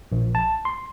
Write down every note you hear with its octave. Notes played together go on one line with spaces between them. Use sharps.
A#1
A5
C6